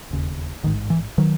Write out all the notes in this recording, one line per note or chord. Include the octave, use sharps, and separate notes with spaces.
E1 D#2 C#3
A1 G#2 D#3
E3
D#3 F#3